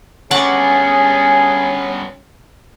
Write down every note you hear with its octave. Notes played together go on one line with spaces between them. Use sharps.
G2 B3 C#4 G#4 F#5 C#6 D6